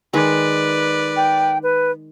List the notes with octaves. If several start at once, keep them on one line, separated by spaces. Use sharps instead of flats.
D#3 G#3 B4 D5
G5
B4